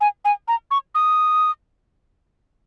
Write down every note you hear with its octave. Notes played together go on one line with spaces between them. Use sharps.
G#5
G#5
A#5
C#6
D#6